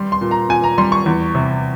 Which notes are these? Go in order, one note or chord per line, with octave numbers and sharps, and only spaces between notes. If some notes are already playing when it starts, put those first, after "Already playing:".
Already playing: G3 C6
C6
A#2
A#5
A#2 G#5
A#5
G3 C6
C#6
E2
C3